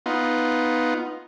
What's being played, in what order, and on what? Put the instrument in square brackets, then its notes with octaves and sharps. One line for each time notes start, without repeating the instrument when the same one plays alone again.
[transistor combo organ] B3 D#4 F4